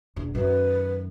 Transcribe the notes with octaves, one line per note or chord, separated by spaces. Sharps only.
E1 E2
F#2 D#3 B4